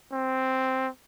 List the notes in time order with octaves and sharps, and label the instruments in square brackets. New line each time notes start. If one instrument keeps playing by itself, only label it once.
[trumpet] C4